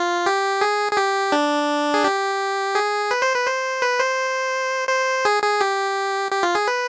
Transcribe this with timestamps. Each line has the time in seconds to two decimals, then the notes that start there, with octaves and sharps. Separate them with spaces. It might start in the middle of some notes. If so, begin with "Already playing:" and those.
Already playing: F4
0.26 G4
0.61 G#4
0.92 G#4
0.97 G4
1.32 D4
1.94 G#4
2.04 G4
2.75 G#4
3.11 B4
3.22 C5
3.34 B4
3.47 C5
3.82 B4
4.00 C5
4.89 C5
5.25 G#4
5.43 G#4
5.61 G4
6.31 G4
6.43 F4
6.55 G#4
6.68 B4